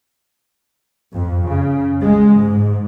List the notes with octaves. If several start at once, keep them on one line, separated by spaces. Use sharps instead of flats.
F2
C#3
G#3
G#2